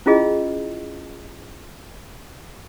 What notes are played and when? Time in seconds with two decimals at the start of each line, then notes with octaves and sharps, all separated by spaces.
0.06 C#4 E4 F4 G#4 D#5